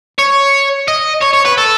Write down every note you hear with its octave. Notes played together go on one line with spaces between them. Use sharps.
C#5
D#5
C#5
C#5
B4
A4